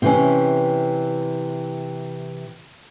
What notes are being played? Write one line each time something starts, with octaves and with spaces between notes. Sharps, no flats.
C3 E3 C#4